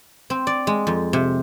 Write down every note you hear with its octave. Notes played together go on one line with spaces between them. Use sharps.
C4
D5
G#3
F2
C3